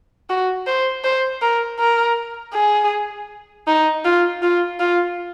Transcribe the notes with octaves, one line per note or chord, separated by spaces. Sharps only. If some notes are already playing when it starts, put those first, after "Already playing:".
F#4
C5
C5
A#4
A#4
G#4
D#4
F4
F4
F4